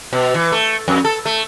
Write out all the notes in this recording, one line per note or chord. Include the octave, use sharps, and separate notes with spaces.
B2
E3
A3
F2
A4
A3